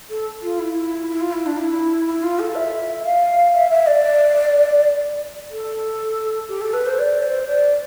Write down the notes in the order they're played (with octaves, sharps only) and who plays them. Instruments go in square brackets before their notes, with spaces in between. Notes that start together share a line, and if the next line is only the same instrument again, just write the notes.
[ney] A4
F4
E4
E4
F4
E4
D4
E4
E4
F4
A4
E5
F5
E5
E5
D5
A4
G4
A4
B4
C5
D5
C5
D5